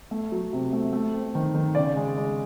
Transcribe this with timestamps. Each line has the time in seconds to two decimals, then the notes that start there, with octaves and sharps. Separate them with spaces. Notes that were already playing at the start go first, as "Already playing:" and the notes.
0.11 A3
0.32 F#3
0.53 C3
0.73 A3
0.93 A3
1.14 C4
1.35 D#3
1.54 D#3
1.75 C#3 D5
1.96 G#3
2.17 G#3